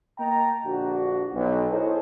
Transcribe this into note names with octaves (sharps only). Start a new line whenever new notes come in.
A#3 D#5 G5 A5 A#5
A#1 D3 D4 F#4
B1
E4 G#4 A4 C5 C#5 D#5